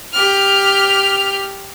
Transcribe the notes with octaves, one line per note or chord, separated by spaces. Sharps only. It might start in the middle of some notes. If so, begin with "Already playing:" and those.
G4 F6